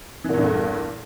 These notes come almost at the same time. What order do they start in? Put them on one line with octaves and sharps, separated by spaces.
E3 A#2 E2 G2 A3